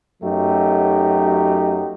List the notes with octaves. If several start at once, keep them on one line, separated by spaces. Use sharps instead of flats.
F#2 F#3 A3 D#4 G4